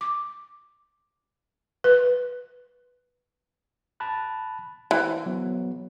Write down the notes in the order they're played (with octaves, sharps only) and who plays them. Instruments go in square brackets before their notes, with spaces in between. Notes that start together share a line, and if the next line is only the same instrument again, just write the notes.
[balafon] D6
B4
[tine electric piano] A5 B5 F#6
[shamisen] E3 [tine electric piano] C5
[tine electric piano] F#3 B3